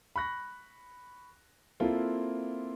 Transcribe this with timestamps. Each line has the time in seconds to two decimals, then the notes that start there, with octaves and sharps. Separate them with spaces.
0.16 B5 C#6 F#6 A#6
1.80 A#3 C4 E4 F4 A4